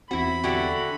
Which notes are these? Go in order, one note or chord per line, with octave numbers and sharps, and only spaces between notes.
E2 C4 E4 F#4 B5
D3 E4 F#4 G4